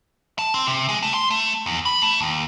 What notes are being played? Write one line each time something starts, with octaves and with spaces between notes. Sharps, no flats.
A5
C4
C3
G#3
A3
C6
A3
E2
B5
A3
D#2